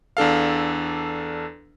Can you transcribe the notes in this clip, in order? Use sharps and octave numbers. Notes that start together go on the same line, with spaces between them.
E2 D4 A4 F5